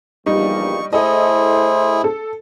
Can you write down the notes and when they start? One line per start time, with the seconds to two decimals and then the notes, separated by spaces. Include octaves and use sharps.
0.26 A#1 E2 G2 G3 D#4 C#6
0.93 A2 E4 G#4 A4 C5 D#5
2.04 A4